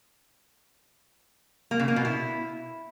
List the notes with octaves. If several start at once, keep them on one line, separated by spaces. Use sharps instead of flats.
A#3
C#3
A#3
B2
E4